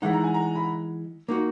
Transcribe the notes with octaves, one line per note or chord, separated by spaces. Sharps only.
E3 G#3 D#4 F#5
A#5
G#5
A#5
B5
A#3 D#4 F#4